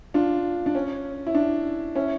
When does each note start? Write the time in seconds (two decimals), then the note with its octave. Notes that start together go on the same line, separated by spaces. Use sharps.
0.14 D4 F4
0.66 D4
0.75 C#4
1.27 E4
1.35 D4
1.95 C#4 E4